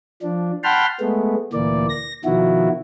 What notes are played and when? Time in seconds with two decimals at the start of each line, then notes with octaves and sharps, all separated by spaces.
0.22 F3 D4
0.64 F#5 G5 A5 B5 C6 F6
1.00 G#3 A3 B3
1.53 D2 A#2 E3 A#3 D5
1.89 A#6
2.25 B2 D#3 F3 E4 F#4